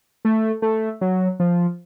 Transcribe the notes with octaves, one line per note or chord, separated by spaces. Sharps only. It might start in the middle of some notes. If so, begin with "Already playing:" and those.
A3
A3
F#3
F3